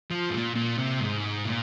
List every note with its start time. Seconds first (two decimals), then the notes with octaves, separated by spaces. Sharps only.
0.11 F3
0.29 G#2
0.33 A#2
0.56 A#2
0.78 C3
1.01 G#2
1.46 A#2